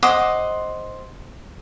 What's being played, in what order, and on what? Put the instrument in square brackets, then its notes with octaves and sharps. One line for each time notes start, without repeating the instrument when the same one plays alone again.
[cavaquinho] C5 D#5 F#5 D6